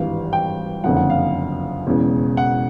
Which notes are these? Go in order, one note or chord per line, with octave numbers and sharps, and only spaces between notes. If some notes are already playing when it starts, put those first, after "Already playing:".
Already playing: G#1 G2 E3 G3 F5
G5
F#1 F2 D3 F3 F#5
F#5
F5
E1 E2 C#3
F#5